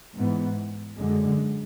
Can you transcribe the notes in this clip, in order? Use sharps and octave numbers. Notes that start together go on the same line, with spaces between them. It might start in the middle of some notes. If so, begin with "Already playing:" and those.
G#2 E3 B3
F#2 D3 G#3